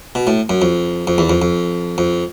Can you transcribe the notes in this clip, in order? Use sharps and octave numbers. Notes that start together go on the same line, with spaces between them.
B2
A2
F#2
F2
F2
E2
F2
F2
F2